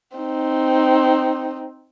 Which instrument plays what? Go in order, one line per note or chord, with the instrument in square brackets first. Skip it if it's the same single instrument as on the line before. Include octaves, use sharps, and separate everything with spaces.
[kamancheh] C4 D#4